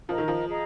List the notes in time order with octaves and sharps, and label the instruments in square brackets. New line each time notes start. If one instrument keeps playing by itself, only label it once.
[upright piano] F3 [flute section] A#4 D#5 A#5
[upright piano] D#3
F3
[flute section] G#4 D#5 A#5